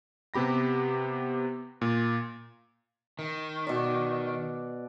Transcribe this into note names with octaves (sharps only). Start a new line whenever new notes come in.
C3 B3 G4 B5 A#6
A#2
D#3
B2 D5